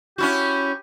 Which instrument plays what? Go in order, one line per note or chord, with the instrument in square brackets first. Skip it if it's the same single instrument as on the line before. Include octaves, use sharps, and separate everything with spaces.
[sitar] C#4 E4 F#4 [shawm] G4